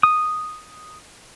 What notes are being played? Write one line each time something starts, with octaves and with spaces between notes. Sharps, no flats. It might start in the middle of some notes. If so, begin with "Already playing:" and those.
D#6